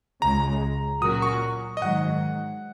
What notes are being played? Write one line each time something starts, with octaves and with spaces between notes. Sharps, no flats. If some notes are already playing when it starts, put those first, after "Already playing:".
C#2 C#3 G#3 A#5
A#2 F#3 C#4 F#4 A#4 D#6
C#6
D#5
G#2 D#3 F#3 F#5